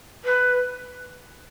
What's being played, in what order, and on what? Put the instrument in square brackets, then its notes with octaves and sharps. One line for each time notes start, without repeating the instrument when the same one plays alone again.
[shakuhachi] B4